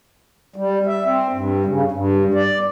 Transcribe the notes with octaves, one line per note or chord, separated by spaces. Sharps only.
G3
E5
C4
G2
C#3
G2
D5